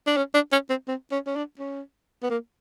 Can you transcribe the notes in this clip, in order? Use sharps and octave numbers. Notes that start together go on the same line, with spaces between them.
D4
C#4
D4
C#4
C4
C4
C#4
C#4
D4
C#4
B3
A#3